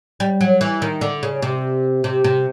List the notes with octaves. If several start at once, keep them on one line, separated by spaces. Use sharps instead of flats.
G3
F#3
E3
D#3
D3
C#3
C3
C3
C3